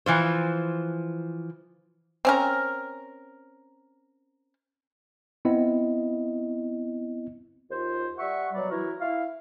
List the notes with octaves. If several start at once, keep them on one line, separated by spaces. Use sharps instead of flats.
E3 F3 C5
C4 C#4 A#4
B3 C4 E4 D#5
D#2 F4 C5
G3 E5 F#5 C#6
B2 F#3 G3 D5
E3 E4 F#4 A#4
E4 F5